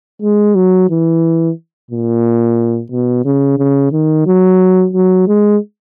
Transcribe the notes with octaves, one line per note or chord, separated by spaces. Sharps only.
G#3
F#3
E3
A#2
B2
C#3
C#3
D#3
F#3
F#3
G#3